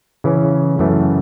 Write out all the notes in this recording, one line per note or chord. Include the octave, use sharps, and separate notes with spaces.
C#3 E3 C#4
F#2 C#3 E3 A3